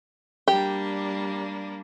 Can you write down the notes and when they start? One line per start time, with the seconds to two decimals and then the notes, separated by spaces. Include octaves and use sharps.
0.48 G3 A#3 D4 G4